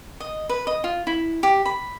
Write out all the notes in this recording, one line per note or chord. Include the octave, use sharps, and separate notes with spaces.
D#5
B4
D#5
F4
E4
G4
B5